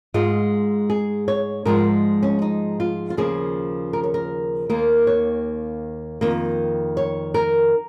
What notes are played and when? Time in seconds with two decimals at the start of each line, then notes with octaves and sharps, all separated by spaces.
0.14 G#2 G#3 F4
0.90 G#4
1.28 C#5
1.65 G#2 F3 G#3 A#4
2.23 C#4
2.42 D#4
2.80 F4
3.10 F4
3.17 D#2 C#3 F3 A#3 G#4
3.93 A#4
4.04 C#5
4.14 A#4
4.70 D#2 D#3 A#3 A#4
5.07 C#5
6.21 F2 D#3 A#3
6.97 C#5
7.34 A#4